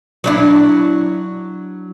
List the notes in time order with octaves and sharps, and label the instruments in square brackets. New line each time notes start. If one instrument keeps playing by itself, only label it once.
[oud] F#3 D4 E4